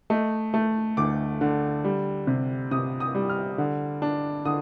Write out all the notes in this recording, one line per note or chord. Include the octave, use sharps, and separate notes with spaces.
A3 D#5
A3
D2 D6
D3
G3
C3
C3 D#6
D#6
G3
F6
D3
D4
D3 D#6